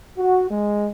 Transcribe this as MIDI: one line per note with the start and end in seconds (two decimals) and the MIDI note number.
0.18 0.46 66
0.49 0.89 56